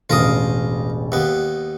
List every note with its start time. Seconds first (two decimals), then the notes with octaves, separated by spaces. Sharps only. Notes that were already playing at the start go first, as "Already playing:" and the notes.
0.10 E1 A1 F4 A#4 D#6
1.12 D#2 B3